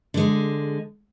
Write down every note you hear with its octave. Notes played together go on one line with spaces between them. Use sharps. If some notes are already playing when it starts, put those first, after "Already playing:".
D3 G#3